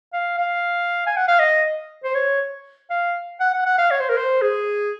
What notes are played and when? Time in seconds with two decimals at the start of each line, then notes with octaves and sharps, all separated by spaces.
0.13 F5
0.38 F5
1.07 G#5
1.17 F#5
1.28 F5
1.39 D#5
2.04 C5
2.14 C#5
2.90 F5
3.40 F#5
3.54 F#5
3.65 F#5
3.78 F5
3.91 C#5
4.00 C5
4.09 A#4
4.17 C5
4.42 G#4